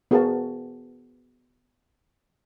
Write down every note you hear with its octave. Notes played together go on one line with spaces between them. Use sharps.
B3 F#4 G#4 A#4 F5 A5